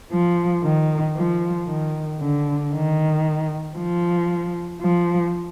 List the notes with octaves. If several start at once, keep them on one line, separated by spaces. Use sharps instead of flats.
F3
D#3
F3
D#3
D3
D#3
F3
F3